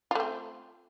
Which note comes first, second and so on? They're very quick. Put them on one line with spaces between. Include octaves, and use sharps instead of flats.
F4 A3 C4